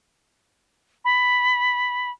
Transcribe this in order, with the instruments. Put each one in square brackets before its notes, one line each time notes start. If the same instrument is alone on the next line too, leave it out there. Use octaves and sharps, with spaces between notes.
[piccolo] B5